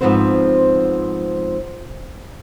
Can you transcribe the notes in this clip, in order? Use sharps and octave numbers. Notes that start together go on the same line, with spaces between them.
G#2 E3 F3 B3 C4 C5